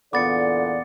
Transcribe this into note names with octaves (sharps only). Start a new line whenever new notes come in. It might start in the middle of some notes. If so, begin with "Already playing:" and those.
E2 A#2 D3 B3 D5 D6 A6 C#7